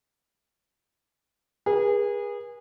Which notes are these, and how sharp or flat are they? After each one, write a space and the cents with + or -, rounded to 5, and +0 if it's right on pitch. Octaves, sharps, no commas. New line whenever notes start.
G#4 -25 B4 -45